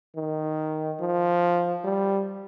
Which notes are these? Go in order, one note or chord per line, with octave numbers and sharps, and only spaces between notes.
D#3
F3
G3